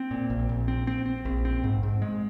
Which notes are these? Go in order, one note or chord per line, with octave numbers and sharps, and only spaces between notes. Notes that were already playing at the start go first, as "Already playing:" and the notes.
Already playing: C4
A#2
A#1
A#1
C4
C4
C4
A#1
C4
G#2
G#2
G#3